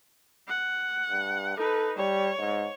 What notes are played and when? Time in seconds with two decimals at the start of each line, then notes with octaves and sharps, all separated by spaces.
0.48 F#5
1.10 G2
1.57 D#4 A4 B4
1.97 G3 C#5
2.39 G#2